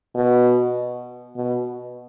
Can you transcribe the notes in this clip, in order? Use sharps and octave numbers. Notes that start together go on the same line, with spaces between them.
B2
B2